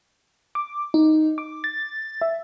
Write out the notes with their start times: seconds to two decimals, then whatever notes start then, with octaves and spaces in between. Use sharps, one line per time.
0.55 D6
0.94 D#4
1.38 D6
1.64 A6
2.21 E5